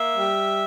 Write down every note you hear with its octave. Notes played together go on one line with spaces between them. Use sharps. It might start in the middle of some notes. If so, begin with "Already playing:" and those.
Already playing: A#3 E5
G3